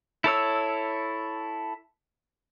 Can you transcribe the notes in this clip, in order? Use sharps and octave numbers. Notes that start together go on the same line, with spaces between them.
E4 A4 C#5 E6